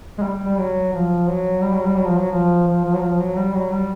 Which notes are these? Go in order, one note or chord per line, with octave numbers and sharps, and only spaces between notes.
G#3
G3
G3
F#3
F3
F#3
G3
F#3
G3
F#3
F3
F#3
F3
F3
F3
F#3
F3
F#3
G3
F#3
G3